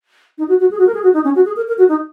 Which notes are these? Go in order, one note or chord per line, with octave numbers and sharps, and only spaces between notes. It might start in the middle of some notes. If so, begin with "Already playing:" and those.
D#4
F#4
F#4
G#4
F#4
A#4
G#4
F#4
D#4
C#4
F#4
G#4
A#4
A#4
F#4
D#4